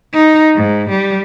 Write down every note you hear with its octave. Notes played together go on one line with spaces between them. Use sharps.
D#4
G#2
G3